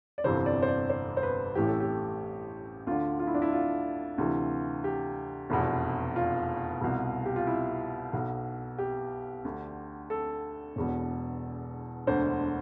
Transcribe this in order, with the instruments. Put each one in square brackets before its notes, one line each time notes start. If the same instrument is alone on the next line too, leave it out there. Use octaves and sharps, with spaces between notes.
[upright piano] D5
G1 F2 C3 E3 C5
D5
C5
D5
C5
C5
B4
A1 A2 E3 G4
A4
G4
D2 D3 F4
F4
E4
D4
E4
F4
D2 C3 E3
G4
F1 E2 B2
F4
C2 B2
G4
F4
E4
B1 B2
G4
D2 D3
A4
E1 E2 B2
E1 D2 D3 C5